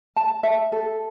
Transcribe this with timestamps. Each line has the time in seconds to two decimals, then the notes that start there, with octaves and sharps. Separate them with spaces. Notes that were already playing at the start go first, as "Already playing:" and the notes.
0.16 A5
0.43 E5
0.72 A4